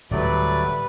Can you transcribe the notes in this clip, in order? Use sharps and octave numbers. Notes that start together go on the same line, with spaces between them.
D1 F#3 G3 A3 B4 D5